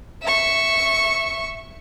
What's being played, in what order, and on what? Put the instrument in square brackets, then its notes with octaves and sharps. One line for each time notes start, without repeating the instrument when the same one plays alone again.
[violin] E5 C#6